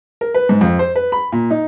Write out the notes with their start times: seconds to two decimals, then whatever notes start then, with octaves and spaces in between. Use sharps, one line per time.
0.21 A#4
0.34 B4
0.49 G#2
0.61 F2
0.79 C5
0.96 B4
1.12 B5
1.32 A#2
1.51 D#4